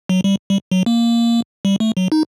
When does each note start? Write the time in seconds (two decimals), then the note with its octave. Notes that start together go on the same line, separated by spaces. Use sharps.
0.09 F#3
0.24 G3
0.50 G3
0.71 F#3
0.86 A#3
1.65 G3
1.80 A3
1.97 F#3
2.12 D#4